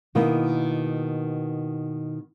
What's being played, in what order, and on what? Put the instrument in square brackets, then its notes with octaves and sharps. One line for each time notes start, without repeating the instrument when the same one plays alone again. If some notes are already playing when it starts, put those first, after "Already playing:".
[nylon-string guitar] B2 D#3 A#3 B3 E4